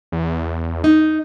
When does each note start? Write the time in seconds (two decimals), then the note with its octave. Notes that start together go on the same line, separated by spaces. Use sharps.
0.12 E2
0.84 D#4